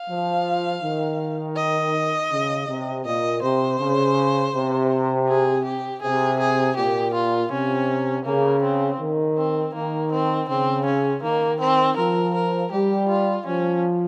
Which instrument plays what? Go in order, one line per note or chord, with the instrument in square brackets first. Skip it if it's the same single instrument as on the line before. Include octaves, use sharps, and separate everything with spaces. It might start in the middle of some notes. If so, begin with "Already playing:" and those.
Already playing: [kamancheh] F5
[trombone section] F3
D#3
[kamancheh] D#5
[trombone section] C#3
C3
[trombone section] A#2 [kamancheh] D#5
[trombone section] C3 [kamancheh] C5
[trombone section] C#3
C3
[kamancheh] G#4
G4
[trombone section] C3 [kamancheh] G#4
[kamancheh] G#4
[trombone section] A#2 [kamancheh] G4
[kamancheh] F4
[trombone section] C3 [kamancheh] C#4
[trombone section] C#3 [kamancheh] A#3
[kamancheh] C4
[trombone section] D#3
[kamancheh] C4
[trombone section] D#3 [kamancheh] A#3
[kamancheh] C4
[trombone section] C#3 [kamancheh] C4
[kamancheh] C#4
[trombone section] D#3 [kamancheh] A#3
[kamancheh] C4
[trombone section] F3 [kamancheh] A#4
[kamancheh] A#4
[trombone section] G3 [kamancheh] G4
[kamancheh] F4
[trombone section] F3 [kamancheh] C#4